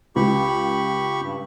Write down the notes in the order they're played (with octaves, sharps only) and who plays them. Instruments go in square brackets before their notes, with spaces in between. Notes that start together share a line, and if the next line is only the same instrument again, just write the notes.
[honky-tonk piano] C#2 [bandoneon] G4 B5 C#6
[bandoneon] G2